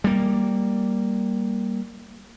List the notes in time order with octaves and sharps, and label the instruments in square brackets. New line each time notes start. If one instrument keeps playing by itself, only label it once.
[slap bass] G3 A#3